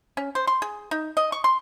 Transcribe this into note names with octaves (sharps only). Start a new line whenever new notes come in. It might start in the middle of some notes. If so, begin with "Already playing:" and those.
C#4
C5
C6
G#4
D#4
D#5
C#6
C6